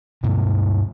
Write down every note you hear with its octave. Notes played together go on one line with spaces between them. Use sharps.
G2 B2 A#3